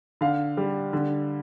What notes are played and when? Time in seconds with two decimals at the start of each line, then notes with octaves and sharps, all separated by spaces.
0.21 D3 F5
0.57 G3
0.93 D3